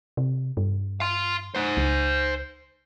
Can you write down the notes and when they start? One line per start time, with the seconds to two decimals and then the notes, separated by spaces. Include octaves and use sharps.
0.17 C3
0.57 G2
1.00 F5 C6
1.55 C5 F#5
1.77 C#2